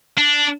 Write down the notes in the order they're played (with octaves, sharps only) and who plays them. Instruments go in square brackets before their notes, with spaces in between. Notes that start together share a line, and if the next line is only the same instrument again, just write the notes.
[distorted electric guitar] D4